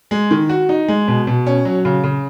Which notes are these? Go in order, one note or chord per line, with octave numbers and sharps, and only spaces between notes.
G#3
D#3
F#4
D#4
G#3
B2
B2
C#4
F#3
C#3
C#3